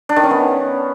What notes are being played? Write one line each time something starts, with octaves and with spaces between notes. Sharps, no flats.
D4
D#3
C#4
B3